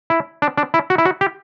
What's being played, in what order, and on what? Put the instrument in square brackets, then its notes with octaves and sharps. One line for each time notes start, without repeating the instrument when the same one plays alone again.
[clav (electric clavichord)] E4
D4
D4
E4
F#4
E4
F#4
G4